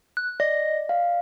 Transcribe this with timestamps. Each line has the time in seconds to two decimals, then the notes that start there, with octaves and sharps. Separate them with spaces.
0.17 F#6
0.40 D5 D#5 A#6
0.89 F5